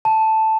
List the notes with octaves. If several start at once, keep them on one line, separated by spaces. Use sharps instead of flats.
A5